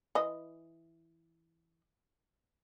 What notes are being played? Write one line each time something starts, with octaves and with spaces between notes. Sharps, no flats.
E3 D#5